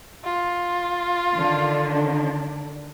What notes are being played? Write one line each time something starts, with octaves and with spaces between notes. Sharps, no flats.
F4
D3 D#3 D4